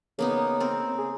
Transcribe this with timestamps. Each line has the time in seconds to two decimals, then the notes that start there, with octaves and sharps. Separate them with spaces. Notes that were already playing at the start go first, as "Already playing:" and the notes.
0.19 C#3 A#3 B3 D#4
0.60 C4 A#4
0.98 G#4